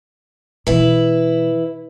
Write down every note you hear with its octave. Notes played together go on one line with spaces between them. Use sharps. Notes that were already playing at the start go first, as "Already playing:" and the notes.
B2 E3 E4 B4